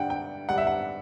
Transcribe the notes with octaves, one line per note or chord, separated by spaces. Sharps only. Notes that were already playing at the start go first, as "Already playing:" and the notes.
Already playing: G2 D3 G3 F#5 G5
G5
G2 D3 G3 F#5
E5
F#5